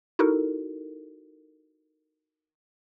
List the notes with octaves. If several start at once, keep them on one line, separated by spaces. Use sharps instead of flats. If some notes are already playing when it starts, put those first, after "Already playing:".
D#4 E4 F#4 A4 A#4